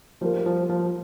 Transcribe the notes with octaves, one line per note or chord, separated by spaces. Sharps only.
F3 G3 A#3 F4 A#4
F3
F3